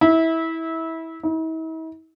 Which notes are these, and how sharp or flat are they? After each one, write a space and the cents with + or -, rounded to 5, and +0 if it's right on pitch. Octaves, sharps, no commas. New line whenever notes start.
E4 -20
E4 -45